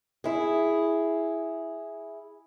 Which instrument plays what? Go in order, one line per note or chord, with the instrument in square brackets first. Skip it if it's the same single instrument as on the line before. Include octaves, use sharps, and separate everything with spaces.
[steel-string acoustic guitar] E4 G#4